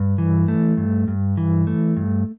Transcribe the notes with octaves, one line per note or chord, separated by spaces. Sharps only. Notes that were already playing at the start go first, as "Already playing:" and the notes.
Already playing: G2
E3
A3
G2
G2
E3
A3
G2